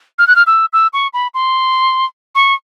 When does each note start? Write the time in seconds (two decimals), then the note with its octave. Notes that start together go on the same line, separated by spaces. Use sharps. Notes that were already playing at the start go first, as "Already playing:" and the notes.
0.19 F6
0.27 F#6
0.36 F6
0.47 E6
0.73 E6
0.93 C#6
1.13 B5
1.34 C6
2.35 C#6